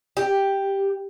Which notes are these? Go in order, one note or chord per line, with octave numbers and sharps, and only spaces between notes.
G4